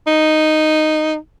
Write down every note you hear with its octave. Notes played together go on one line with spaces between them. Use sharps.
D#4